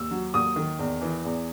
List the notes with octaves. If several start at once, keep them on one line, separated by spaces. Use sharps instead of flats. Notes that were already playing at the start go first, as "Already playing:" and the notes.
Already playing: D#2 E6
F#3
D#2 D#6
D#3
E2
E3
E2